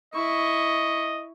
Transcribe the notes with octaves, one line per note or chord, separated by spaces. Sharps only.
E4 D#5 C#6